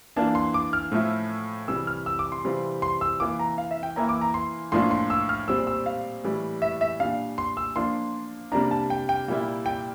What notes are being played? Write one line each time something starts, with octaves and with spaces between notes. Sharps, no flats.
E3 A#3 D4 F4 A5
C6
D6
F6
A2 F3 A3 E4
C3 E3 G3 E6
F6
E6
D6
C6
C3 E3 G3 C4 F4
C6
E6
E3 A#3 F4 D6
A#5
F5
E5
G5
E3 A#3 E4 A#5
D6
A#5
C6
A2 F3 A#3 D4 F4 C6
C6
E6
F6
A#2 G3 C4 E6
E6
F5
A2 E3 G3
E5
E5
A#2 G3 D4 F5
C6
E6
F3 A#3 D4 F4 C6
C3 G3 A#3 D4 A#5
A5
G5
G5
A#2 G3 A#3 E4
G5